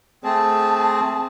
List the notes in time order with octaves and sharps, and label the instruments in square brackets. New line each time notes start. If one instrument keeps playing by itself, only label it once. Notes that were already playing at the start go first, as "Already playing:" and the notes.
[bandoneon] A3 C4 G#4 [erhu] A5